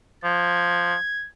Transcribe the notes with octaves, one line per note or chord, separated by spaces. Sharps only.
F3 G#6